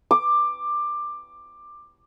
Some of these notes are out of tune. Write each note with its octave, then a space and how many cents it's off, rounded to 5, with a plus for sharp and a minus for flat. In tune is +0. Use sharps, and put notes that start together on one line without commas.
D6 +15